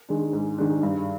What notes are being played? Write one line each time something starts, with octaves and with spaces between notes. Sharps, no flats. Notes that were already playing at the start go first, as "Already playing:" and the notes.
D#3 G#3 D4
G#2
D#3 G#3 D4
G2